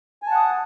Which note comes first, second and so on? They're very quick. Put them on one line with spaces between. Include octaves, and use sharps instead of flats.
G#5 A5 F#5 D#6